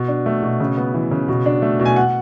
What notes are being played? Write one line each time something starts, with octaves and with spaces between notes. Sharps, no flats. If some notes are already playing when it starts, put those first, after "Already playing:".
Already playing: B2
D4
A3
B2
C#3
B3
E3
C#3
B2
D4
A3
B2
G#5
F#5